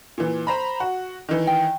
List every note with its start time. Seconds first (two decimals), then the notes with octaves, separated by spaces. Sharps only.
0.18 A#2 E3
0.47 C5 A#5 B5
0.80 F#4
1.29 D#3 E3
1.47 G5